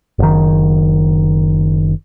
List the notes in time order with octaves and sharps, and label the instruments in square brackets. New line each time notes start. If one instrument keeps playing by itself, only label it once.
[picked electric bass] F#1 D#3